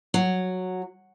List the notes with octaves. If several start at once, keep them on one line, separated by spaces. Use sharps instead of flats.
F#3